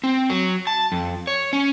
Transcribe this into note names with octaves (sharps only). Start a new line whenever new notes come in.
C4
F#3
A5
F2
C#5
C#4